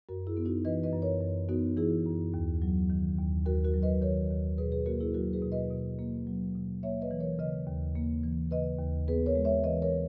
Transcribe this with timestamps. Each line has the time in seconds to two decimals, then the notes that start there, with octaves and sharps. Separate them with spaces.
0.09 F#2 F#4 A#4
0.27 E4 G#4
0.37 B3
0.46 D#4 F#4
0.65 E3 B4 D#5
0.83 B4 D#5
0.93 F#2
1.02 A#4 C#5
1.21 F#2
1.49 B3 D#4 F#4
1.77 E3 E4 G#4
2.06 F#2
2.34 D#2
2.62 F#3
2.90 D#3
3.18 D#2
3.46 D#2 F#4 A#4
3.64 F#4 A#4
3.74 F#3
3.83 B4 D#5
4.02 D#3 A#4 C#5
4.30 D#2
4.58 B2 G#4 B4
4.72 G#4 B4
4.86 A#3 F#4 A#4
5.00 E4 G#4
5.14 F#3 F#4 A#4
5.33 G#4 B4
5.42 B2
5.52 B4 D#5
5.70 B2
5.99 A#3
6.27 F#3
6.55 B2
6.83 A#3 C#5 E5
7.01 B4 D#5
7.11 E3
7.20 A#4 C#5
7.39 C#3 B4 D#5
7.67 D#2
7.95 A#3
8.23 E3
8.51 C#3 B4 D#5
8.79 D#2
9.08 B3 G#4 B4
9.26 A#4 C#5
9.35 G#3
9.45 C#5 E5
9.64 E3 B4 D#5
9.82 A#4 C#5